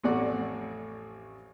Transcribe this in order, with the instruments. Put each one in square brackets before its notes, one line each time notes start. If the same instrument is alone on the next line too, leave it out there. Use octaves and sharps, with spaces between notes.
[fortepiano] A1 F2 A2 A3 D5 F#5